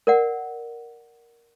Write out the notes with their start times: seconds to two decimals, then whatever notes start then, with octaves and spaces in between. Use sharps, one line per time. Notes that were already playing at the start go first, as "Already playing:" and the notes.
0.07 A#4 D5 F#5